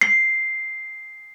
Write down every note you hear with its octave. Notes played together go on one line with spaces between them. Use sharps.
C7